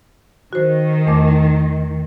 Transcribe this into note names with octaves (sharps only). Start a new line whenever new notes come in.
D#3 F#4 C5
E2 A3 D6